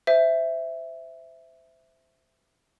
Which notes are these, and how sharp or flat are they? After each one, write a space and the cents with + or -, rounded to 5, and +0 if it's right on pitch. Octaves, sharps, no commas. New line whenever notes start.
C5 -20 E5 +0